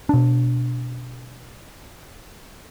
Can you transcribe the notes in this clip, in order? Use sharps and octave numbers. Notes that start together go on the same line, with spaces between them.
B2 D4